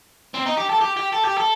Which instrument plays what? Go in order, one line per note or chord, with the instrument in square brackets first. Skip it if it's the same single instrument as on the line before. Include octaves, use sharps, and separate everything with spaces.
[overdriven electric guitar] C4
D#4
G4
A4
G4
G4
A4
G4
A4